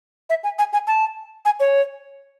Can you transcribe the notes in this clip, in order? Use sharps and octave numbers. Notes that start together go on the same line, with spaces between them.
E5
G#5
G#5
G#5
A5
G#5
C#5